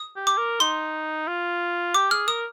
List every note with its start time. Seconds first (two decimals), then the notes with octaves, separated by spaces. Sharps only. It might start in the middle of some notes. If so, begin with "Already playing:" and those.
Already playing: D#6
0.16 G4
0.27 D6
0.38 A#4
0.60 D#4 C6
1.28 F4
1.94 G4 D6
2.11 G#4 F6
2.28 A#4 D#6